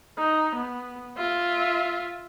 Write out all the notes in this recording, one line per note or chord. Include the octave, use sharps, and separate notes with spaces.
D#4
B3
F4 E5